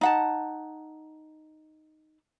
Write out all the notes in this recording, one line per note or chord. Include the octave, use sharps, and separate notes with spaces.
D#4 F#5 A5